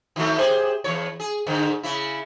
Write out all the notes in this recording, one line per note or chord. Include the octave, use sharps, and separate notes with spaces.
D#3 F#3 A3
G4 G#4 C5
E2 A2 C#5
G#4
G#2 D3
C#3 E4